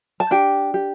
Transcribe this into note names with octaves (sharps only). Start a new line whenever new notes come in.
A5
D4 G4 G5
G4